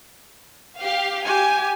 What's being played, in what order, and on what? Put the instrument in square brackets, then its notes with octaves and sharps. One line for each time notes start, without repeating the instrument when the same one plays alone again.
[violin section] G4 F5
[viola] G4 [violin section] G#5